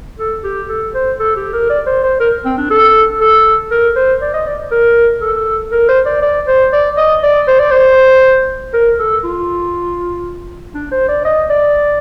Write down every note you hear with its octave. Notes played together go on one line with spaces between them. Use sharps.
A4
G4
A4
C5
A4
G4
A#4
D5
C5
C5
A#4
C4
D4
A4
A4
A#4
C5
D5
D#5
D5
A#4
A4
A#4
C5
D5
D5
C5
D5
D#5
D5
C5
D5
C5
A#4
A4
F4
D4
C5
D5
D#5
D5